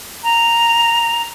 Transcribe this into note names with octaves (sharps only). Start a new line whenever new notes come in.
A#5